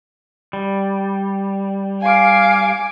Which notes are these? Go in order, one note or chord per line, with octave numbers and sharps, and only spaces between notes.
G3
F5 G#5 D6